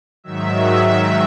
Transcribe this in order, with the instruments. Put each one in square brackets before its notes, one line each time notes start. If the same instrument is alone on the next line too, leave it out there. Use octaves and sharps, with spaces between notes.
[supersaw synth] G#2 D#3 F#3 E5